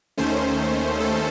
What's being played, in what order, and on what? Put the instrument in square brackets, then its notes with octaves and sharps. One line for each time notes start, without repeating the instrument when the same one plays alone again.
[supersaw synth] D#2 D#3 A3 C#4 C5
A4